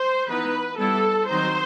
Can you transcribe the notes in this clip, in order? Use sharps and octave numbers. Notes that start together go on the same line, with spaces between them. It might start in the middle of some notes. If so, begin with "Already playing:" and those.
Already playing: C5
E3 B3 D#4 B4
G3 B3 E4 A4
D#3 F#3 C4 D#4 C5